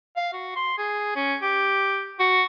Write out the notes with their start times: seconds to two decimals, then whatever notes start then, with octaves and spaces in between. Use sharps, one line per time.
0.17 F5
0.33 F#4
0.56 C6
0.78 G#4
1.16 C#4
1.42 G4
2.20 F#4